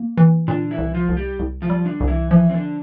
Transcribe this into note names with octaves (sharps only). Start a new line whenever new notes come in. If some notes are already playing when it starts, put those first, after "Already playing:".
Already playing: A#3
E3
A#2 D3 D4
E3 E4
C2
F3 F4
C2
G3 G4
C2
F3 F4
G3
D3 D4
C2
E3 E4
E3 F3 E4
C4
D3 D4